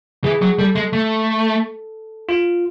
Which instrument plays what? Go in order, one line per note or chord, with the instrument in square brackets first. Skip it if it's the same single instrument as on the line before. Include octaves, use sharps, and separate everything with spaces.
[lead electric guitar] E3 [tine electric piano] G#4
[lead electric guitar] F#3
[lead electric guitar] G3 [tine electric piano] A4
[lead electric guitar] G#3
A3
[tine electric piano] F4